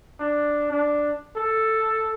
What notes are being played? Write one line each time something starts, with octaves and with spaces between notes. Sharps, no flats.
D4
D4
A4